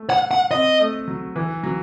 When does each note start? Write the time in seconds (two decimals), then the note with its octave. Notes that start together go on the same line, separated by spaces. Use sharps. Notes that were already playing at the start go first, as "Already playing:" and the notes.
Already playing: A3
0.10 F#5
0.31 F#5
0.51 C4 D#5
0.80 A3
1.08 F#3
1.36 E3
1.64 F#3